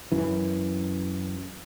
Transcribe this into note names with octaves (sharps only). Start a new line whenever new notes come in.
F#2 E3